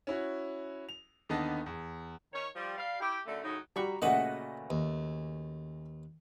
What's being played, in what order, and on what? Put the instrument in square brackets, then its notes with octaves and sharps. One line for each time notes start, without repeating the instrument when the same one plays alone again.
[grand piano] C#4 E4 F#4
F7
D#2 D3 B3 D#4 D#5 A5
E2
[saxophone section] D#3 C#5
F3 G3
G3 F5
E4 G4
F#2 D3 A3
A2 C#3 F#3 D#4
[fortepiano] G3 F#4 [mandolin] A#5 B5 C#6
[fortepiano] A#2 C#3 A3 [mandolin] F#4 B4 F#5 [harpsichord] D#5
[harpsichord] D#2